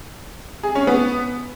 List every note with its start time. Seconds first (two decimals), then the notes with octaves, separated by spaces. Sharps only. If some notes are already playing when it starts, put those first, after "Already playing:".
0.63 G#4
0.75 C#4
0.87 B3